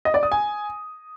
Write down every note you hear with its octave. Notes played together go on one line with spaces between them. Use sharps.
D#5
D5
D#6
G#5